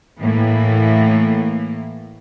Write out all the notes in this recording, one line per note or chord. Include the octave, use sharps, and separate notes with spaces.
A2 E3 A#3